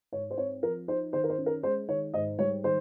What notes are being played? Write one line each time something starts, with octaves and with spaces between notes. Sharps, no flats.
G#2 C#5
C5
C4 C#5
F3 A#4
D#4 C5
D#3 C5
A#4
C5
C#4
A#4
G#3 C5
D#3 C#5
G#2 D#5
G3 C#5
D#3 C5